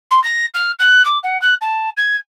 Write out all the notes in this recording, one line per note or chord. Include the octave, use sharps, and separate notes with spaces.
C6
A#6
F6
F#6
D6
F#5
F#6
A5
G#6